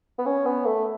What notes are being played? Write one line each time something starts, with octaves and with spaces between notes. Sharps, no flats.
B3
C#4
B3
A3